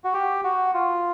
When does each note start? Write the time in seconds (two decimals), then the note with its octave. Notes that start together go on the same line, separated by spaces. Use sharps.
0.04 F#4
0.14 G4
0.44 F#4
0.74 F4